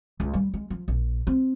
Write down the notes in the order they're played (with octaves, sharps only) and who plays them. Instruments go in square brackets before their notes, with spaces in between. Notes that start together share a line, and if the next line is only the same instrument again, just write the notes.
[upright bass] C#2
G3
G#3
F3
A#1
C4